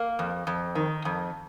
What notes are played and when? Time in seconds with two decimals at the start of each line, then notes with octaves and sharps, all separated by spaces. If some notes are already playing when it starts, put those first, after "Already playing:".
Already playing: A#3
0.19 F2
0.47 F2
0.75 D#3
1.05 F2